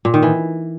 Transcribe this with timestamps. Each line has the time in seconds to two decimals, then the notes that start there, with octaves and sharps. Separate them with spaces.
0.05 A#2
0.14 D#3
0.23 E3